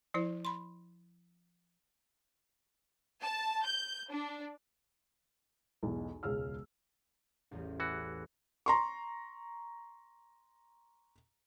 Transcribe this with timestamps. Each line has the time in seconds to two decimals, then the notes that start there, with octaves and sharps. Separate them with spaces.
0.14 F3 E4 C5
0.45 B5 C6
3.22 A5
3.65 G6
4.11 D4
5.83 B1 E2 G#2
6.23 E1 C#2 C#3 G#4 E6 F6
7.51 A1 E2 G3
7.80 E3 F#4 B4
8.66 A#5 C6 C#6